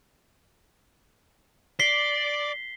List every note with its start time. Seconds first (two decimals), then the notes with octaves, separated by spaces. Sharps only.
1.79 D5 B6 C7 G7